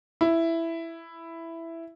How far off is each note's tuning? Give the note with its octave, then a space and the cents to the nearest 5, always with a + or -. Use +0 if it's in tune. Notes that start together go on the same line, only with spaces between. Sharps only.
E4 +5